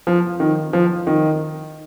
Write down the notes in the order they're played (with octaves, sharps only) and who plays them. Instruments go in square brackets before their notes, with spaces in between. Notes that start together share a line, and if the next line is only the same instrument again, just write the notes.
[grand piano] F3
D#3
F3
D#3